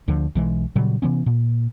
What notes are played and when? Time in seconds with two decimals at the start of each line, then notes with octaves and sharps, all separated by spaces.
0.08 D2 D3 F3
0.35 B1 E3 G#3
0.76 A#2 C#3 F#3 G3
1.02 C3 E3 B3 C#4
1.26 A#2